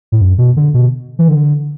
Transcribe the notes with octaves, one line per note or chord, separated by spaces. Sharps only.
A2
F#2
B2
D3
B2
E3
D3